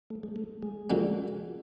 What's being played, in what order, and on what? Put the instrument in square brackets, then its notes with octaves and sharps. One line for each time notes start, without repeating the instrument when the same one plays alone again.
[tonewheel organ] A3
G#3
A3
G#3
[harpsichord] F2 D3 F#3 A#3